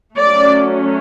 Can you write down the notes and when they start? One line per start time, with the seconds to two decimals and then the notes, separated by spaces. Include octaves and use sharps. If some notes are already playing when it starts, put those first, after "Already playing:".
0.19 F#3 A3 C#4 D5